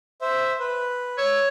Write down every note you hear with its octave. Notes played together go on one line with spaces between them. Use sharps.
C5 E5
B4
C#5 E6